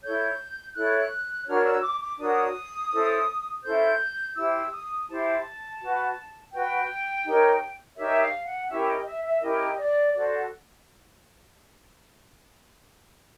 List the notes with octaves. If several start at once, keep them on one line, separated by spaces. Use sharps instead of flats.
E4 A4 C#5 G6
E4 A4 C#5 F#6
D4 F#4 A#4 C#5 F6
E6
D6
D6
D4 F#4 A#4 C#5 D#6
C#4 E4 A4 C5
C#4 E4 A4 C5 G6
E4 G4 C5 E6
D#6
E4 G4 C5 A5
F#4 B4
F#4 B4 G5
D#4 G4 A#4 C#5
D#4 G4 A#4 C#5 E5
F5
F#5
C#4 E4 G4 A#4 E5
D#5
E5
E5
C#4 E4 G4 A#4 D#5
D5
F#4 A4 C5 D5